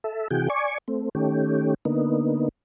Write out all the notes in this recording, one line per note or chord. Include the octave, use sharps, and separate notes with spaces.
A4 E5
C3 E3 F#4 G#4 G5
D5 G#5 C#6
A3 C4
D#3 A3 C#4 G4
D3 A#3 B3 D#4